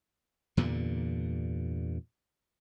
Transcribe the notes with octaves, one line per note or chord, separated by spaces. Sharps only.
E2 G2 A#2 D3